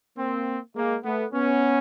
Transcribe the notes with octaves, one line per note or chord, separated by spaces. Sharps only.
A#3 C4
G#3 A#3
A3 B3
B3 C#4